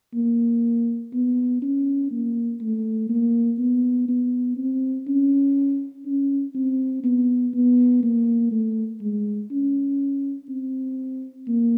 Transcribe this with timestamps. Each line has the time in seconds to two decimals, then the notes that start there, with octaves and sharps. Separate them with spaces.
0.14 A#3
1.13 B3
1.62 C#4
2.11 A#3
2.61 A3
3.09 A#3
3.59 B3
4.08 B3
4.57 C4
5.07 C#4
6.06 C#4
6.55 C4
7.04 B3
7.54 B3
8.03 A#3
8.52 A3
9.01 G#3
9.51 C#4
10.49 C4
11.48 A#3